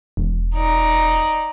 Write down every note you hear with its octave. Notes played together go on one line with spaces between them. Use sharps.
E1
D#4 D5